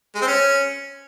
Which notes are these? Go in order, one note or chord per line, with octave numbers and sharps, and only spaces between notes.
G#3
C4
C#4